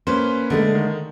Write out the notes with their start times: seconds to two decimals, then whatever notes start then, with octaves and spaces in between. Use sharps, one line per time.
0.07 A#3 C#4 B4 C5
0.50 D3 G#3 A3
0.75 D#3